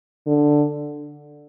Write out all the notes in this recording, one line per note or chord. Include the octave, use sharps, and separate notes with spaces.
D3